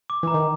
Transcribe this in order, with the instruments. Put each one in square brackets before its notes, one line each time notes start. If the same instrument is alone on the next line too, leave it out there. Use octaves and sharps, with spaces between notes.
[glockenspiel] D6
[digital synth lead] E3 [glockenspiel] A#5
[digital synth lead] D#3